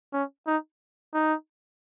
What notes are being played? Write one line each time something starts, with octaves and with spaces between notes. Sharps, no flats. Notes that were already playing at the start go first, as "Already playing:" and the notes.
C#4
D#4
D#4